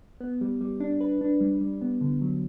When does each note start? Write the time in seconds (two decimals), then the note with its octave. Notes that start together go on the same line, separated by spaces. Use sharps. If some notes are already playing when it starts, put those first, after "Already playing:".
0.21 B3
0.41 G3
0.61 G3
0.80 D4
1.01 B4
1.21 D4
1.41 G3
1.61 G3
1.82 B3
2.01 D3
2.22 F#3